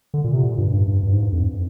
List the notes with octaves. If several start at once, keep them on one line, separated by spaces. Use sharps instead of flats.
D3
A#2
C3
A#2
G2
G2
G2
G2
G#2
G2
F2